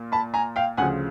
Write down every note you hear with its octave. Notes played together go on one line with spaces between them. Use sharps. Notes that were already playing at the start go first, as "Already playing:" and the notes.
Already playing: A#2 A#3
A5 B5
G#5 A#5
F5 G5
D2 C#3 F3 F#5 G#5